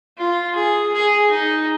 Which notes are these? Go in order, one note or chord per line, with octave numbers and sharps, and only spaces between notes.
F4
G#4
G#4
D#4